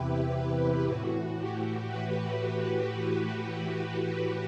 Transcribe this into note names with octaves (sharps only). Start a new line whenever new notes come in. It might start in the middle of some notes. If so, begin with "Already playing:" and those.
Already playing: E2 C3 E3 E4 G4 B4
E4
A2 E3 F#4
G4
B4